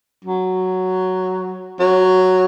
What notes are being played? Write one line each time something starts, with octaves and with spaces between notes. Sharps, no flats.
F#3
F#3